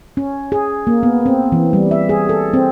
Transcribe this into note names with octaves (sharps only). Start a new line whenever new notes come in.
C#4
G#4
A#3
B3
C4
E3
G3
E5
G#4
A4
C4